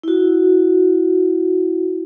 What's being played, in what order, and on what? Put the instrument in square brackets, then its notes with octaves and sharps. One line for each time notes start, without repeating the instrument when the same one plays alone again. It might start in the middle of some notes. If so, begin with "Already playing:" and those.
[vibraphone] E4 F#4